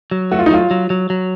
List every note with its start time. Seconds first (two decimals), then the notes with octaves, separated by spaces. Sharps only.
0.11 F#3
0.31 A3 F#4
0.39 F4
0.46 D#4
0.51 F#3 F4
0.71 F#3
0.90 F#3
1.10 F#3